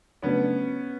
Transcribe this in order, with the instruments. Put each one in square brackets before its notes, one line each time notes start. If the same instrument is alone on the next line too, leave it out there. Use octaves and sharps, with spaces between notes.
[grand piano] C#3 F#3 A3 D4 [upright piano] B3 C#4